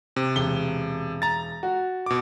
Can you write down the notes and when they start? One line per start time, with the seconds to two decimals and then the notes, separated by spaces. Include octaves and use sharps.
0.16 C3
0.35 E1 G7
1.22 A#5 A6
1.63 F#4
2.06 B2 D6